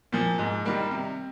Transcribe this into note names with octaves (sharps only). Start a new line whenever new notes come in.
A#2 F3
G#2
D#3 G3 A#3
C3